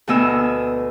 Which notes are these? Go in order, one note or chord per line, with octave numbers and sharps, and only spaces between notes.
D2 B2 B3 D#5 G#5 E6